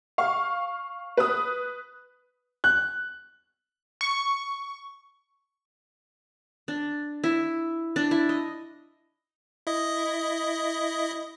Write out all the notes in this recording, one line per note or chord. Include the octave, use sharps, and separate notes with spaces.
F5 C#6
B4 D#6
F#6
C#6
D4
E4
D4
E4
D#5
E4 D#5